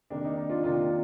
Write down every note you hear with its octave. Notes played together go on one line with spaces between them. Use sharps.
C3 D#3 A#3 D4
D#4
D#4
D4 F4
C3 D#3 A#3 D4 F4